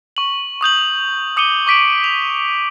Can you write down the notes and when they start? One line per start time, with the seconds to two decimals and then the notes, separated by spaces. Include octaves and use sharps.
0.17 C#6 F#7
0.61 C#6 D#6 G6 F#7
1.37 D6 D#6 C#7 D#7 G7
1.67 C#6 D6 B6 D7 F#7
2.04 F7